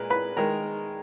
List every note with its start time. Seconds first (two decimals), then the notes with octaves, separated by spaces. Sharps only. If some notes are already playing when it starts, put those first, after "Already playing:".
Already playing: A#2 G#3 A#4 B4
0.10 B4 B5
0.37 D#3 G#3 A#4 A#5